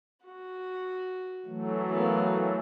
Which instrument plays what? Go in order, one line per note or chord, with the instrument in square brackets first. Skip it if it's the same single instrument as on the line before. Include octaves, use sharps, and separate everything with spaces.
[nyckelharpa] F#4
[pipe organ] E3 F#3 A3
[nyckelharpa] A#3 B3